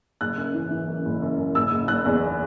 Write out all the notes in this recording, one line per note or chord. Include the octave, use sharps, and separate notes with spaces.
F#1 F#6
F#2
E3
E3
F#2
F#1
F#2
F#2
F#1 E6
F#1
F#1 F#6
E2